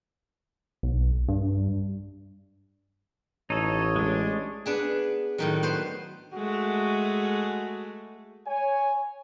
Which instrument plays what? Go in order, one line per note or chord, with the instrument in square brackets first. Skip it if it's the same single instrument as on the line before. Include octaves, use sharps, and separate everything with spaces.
[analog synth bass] B1
G2
[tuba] A1 [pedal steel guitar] D#4 A4 [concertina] C#5 D#5
[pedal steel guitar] G#3 D4
[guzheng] B3 D4 G#4
A2 D#3 F#3
B3 C5
[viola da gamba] G#3 A3 [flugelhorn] F#4
[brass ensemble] C#5 G#5